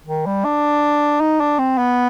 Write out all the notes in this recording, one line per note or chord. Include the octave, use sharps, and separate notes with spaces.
D#3
G3
D4
D#4
D4
C4
B3